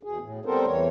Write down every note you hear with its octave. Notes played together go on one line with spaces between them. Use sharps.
E2 B2 G#4
A2
G3 B3 C4 A4 A#4 C5
E2 E3 C#5